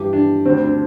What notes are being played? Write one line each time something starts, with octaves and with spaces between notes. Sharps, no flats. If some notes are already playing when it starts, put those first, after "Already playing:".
Already playing: G2 E3 G4
D4
D2 D3 C4
D4